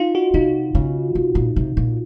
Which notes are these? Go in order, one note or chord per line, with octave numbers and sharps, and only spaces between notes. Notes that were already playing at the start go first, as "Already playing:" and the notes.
Already playing: D#4 F4
F#4
C3 D#4
C#3
C3
A#2
C3
A#2